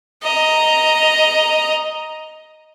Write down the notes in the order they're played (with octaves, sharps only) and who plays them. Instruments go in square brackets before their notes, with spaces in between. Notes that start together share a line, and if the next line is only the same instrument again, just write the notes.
[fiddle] D#5 A#5